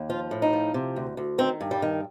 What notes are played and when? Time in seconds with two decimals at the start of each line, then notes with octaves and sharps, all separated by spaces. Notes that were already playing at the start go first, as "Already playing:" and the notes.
Already playing: D#2
0.10 F3 F4
0.31 A2
0.42 D#4
0.53 F3
0.74 C3
0.96 D2
1.17 D2
1.38 D#3 C4
1.61 G2
1.71 G3
1.82 D#3